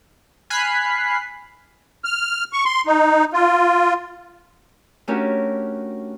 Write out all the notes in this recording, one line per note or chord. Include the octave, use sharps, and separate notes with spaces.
G#5 B5 F6 F#6 B6 C7
F6
C#6
C6
D#4
F4
A3 C#4 D4 F#4 G4 A#4